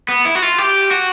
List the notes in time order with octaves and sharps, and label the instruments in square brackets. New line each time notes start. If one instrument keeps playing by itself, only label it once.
[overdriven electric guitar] B3
E4
F#4
F4
G4
F#4